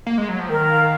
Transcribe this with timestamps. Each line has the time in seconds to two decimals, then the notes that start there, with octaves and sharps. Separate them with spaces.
0.06 A#3
0.18 G#3
0.28 F#3
0.39 F3
0.49 D#3 A#4
0.69 F5